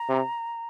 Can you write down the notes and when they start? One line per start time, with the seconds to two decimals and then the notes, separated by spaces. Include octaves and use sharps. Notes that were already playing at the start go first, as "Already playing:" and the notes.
Already playing: A#5
0.09 C3